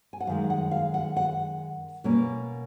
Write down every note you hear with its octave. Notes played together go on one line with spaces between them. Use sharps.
G#5
F#5
F#2 D#3 G#3 F5
F#5
F5
F#5
F#5
B2 A#3 C#4